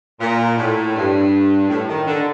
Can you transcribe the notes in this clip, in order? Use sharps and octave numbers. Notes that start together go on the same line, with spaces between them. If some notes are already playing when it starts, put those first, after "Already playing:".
A#2
A2
G2
A2
D#3
D3